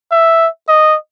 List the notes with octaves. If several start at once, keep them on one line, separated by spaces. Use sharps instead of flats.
E5
D#5